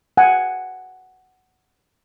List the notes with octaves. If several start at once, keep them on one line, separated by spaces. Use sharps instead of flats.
F#5 G#5